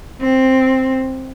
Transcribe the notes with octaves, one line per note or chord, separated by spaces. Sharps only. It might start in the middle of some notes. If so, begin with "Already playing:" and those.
C4